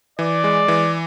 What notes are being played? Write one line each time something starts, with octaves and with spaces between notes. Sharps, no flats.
E3 D5
G#3
E3